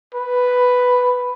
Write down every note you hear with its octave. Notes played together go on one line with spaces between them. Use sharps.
B4